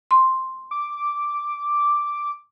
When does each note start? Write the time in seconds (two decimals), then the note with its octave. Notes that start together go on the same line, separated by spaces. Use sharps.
0.11 C6
0.71 D6